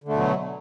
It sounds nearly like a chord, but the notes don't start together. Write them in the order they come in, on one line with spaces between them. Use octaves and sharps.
D3 A3 B2 F#3